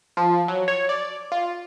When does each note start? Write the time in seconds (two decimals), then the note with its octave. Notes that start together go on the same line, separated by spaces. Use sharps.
0.17 F3
0.48 F#3
0.68 C#5
0.89 D5
1.32 F4